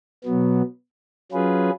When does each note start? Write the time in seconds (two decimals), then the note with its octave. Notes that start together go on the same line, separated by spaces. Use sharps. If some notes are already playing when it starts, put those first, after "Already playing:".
0.24 B2 F#3 B3
1.32 F#3 C#4 F4 G#4 B4